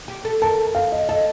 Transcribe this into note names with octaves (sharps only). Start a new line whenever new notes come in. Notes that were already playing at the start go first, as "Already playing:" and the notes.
G4
A4
A#4 A5
F5
D#5
A4 D#5